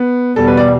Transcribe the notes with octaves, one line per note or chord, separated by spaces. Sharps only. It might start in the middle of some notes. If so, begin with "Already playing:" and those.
Already playing: B3
E2 B2 G3 A4
B4
D5